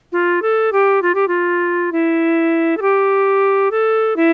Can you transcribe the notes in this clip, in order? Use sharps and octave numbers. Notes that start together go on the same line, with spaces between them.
F4
A4
G4
F4
G4
F4
E4
A4
G4
A4
E4